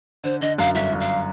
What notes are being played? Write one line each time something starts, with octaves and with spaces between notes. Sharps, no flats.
D3 C5
D3 D#5
F#2 F5
G1 E5
G1
F5